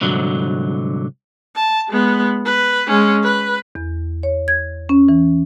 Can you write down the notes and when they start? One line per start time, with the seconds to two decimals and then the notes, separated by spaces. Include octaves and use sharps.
0.01 C2 G#2 D3 F#3
1.56 A5
1.89 G#3 B3
2.45 B4
2.87 G#3 C#4
3.23 B4
3.75 E2
4.23 C#5
4.48 G#6
4.89 C#4
5.09 E3